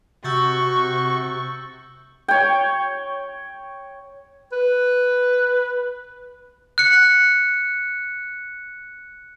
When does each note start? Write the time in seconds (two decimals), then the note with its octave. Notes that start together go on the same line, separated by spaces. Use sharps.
0.24 C3 F#4 C#6 E6 G6 A6
2.28 C#5 G5
4.52 B4
6.78 F#6 C#7